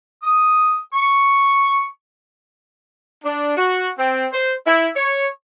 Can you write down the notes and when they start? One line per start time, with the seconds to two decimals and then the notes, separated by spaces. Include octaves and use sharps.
0.22 D#6
0.94 C#6
3.25 D4
3.57 F#4
3.97 C4
4.32 C5
4.66 E4
4.96 C#5